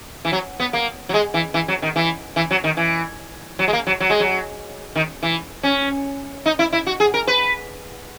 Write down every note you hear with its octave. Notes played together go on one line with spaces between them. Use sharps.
E3
F#3
B3
A#3
F#3
G#3
E3
E3
F#3
D#3
E3
E3
F#3
D#3
E3
F#3
G#3
A#3
F#3
F#3
G#3
F#3
D#3
E3
C#4
D#4
E4
E4
F#4
G#4
A#4
B4